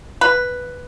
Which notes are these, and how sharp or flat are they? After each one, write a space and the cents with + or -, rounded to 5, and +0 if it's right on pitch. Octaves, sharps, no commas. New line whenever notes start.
B4 +0